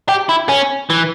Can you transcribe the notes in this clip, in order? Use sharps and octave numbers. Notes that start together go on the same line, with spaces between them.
G4
E4
C#4
E3